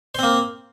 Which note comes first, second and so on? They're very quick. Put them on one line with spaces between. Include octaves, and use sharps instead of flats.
C5 C4 A#3